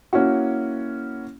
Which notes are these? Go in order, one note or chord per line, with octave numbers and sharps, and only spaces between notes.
A#3 C#4 E4 F#4